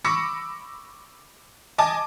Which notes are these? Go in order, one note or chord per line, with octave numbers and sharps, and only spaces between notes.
B5 C#6 D6 E6 A#6 C#7
D#5 G#5 A5 D6